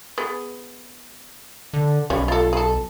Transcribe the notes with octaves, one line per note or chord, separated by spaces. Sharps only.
B3 G#4
D3
B1 G3 C#4
F4 A4
G#4 A4